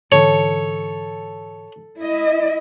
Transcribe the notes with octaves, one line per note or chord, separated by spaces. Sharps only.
G#2 D3 E3 A4 C#5
E4 D#5